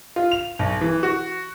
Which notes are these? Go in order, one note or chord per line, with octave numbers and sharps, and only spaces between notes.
F4
F7
B1
E3
F#4